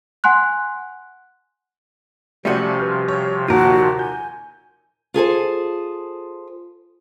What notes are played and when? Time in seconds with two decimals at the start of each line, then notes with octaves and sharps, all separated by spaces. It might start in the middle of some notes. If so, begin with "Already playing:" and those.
0.24 F#5 G#5 C6 F#6
2.45 C3 F3 G3 A3 C#4 F#4 D5
2.79 B4 F6
3.08 C#5
3.48 D#2 A#2 F4 F#4 A#4 A5
3.99 G#5 G6
5.14 F4 G#4 A4 C5